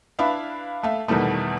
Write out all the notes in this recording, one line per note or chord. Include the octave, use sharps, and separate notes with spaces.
D4 E4 B4 E5 F5 B5
A3 E5 F5
E2 B2 D#3 E3 G3 A3